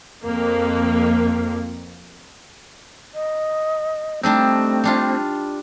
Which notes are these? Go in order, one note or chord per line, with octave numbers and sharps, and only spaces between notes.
F2 A#3
D#5
G3 A3 C4 D4 D#4
G3 D4 F4